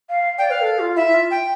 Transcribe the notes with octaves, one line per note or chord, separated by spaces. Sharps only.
F5
D5 G5
B4 F5
A4
F4
E4 E5
E4
F4
G5